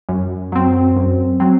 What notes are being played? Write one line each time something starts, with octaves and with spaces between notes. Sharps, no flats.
F#2
F#3 C4
F#2
F#3 C4